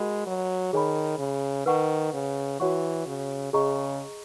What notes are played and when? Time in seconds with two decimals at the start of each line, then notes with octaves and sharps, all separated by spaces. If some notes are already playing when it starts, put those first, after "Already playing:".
Already playing: G#3 F#4 A#4 D#5 F#5 B5
0.27 F#3
0.73 D#3 G#4 C#5 G#5 B5
1.19 C#3
1.66 D#3 B4 F#5 C#6
2.13 C#3
2.60 E3 F#4 C#5 F#5 C#6
3.07 C#3
3.53 C#3 G#4 D#5 A#5 C#6